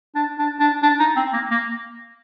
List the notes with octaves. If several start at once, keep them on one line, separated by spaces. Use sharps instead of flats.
D4
D4
D4
D4
D#4
C4
A#3
A#3